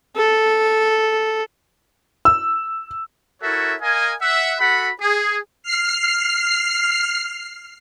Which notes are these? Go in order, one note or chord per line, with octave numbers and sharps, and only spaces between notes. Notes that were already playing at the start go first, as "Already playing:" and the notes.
A4
E6
E4 F#4 A4 A#4 C#5 E5
A#4 D#5 F5 G#5
E5 F#5
F#4 A4 F#5 B5
G#4
F6 C7